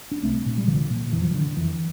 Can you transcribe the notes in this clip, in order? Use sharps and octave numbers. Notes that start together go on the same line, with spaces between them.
D4
C2 A3 C4
A#2
G3
C2 D3 F3
A#2
F2 E3
F3
E3
D3
F2 E3